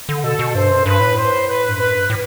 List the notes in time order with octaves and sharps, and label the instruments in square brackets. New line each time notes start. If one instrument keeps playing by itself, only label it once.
[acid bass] D3
[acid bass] B2 [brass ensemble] A4
[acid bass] B2
[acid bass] G2 [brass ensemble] C5
[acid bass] F#2
[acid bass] G2 [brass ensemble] B4
[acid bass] A2
[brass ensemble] C5
B4
[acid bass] G2
[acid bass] F#2 [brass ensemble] B4
[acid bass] G2
A2